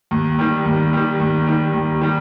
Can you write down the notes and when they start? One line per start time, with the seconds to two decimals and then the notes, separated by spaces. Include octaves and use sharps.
0.11 D#2
0.39 D#3 G3
0.66 D#2
0.93 D#3 G3
1.20 D#2
1.47 D#3 G3
1.74 D#2
2.01 D#3 G3